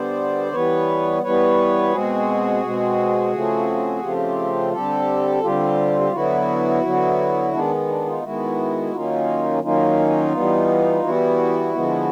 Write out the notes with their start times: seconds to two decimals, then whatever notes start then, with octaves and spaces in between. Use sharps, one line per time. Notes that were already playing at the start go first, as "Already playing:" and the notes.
Already playing: D3 G3 B3 C5 D5
0.52 E3 G3 B3 B4 C#5
1.22 E3 G3 B3 B4 C#5
1.92 B2 G#3 C4 F#4 G#4
2.63 B2 G#3 C4
3.33 C#3 F3 A3 C4
4.02 C#3 F3 A3 C4 F4 G4
4.73 D3 G3 C4 G4 A4
5.43 D3 G3 C4 F4 G4
6.01 G4
6.12 D3 F#3 B3 E4 F#4
6.83 D3 F#3 B3
7.53 D#3 G#3 B3 D4
7.88 D4
8.06 D#4 F4
8.22 D#3 G#3 B3 E4 F#4
8.93 D#3 F#3 A#3 C#4 D#4 F4
9.63 D#3 F#3 A#3 C#4 D#4 F4
10.33 E3 G3 B3
11.03 E3 G3 B3 E4 F#4
11.74 D3 F3 G#3 B3